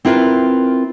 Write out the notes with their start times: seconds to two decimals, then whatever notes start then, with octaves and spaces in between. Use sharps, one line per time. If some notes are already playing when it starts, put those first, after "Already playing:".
0.05 C4 E4 F4 A#4 B4